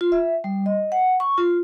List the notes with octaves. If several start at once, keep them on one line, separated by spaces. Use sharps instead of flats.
F4
E5
G3
D#5
F#5
C#6
F4